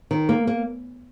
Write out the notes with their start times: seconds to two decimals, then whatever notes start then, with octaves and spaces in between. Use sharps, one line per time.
0.11 D#3
0.29 A#3
0.47 A#3